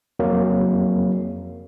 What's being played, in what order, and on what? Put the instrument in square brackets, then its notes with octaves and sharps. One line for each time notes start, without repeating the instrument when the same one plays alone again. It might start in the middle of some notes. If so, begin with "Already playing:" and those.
[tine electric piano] F2 F#3 A#3